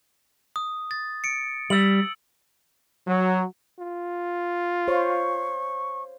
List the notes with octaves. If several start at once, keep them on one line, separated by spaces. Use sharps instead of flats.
D#6
A6
C#7 D7
G3 E6 F#7
F#3
F4
C5 C#5 F5 C#6